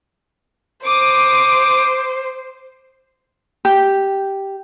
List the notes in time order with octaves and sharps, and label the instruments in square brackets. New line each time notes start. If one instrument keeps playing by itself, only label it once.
[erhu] C5 [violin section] D6 D#6
[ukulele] G4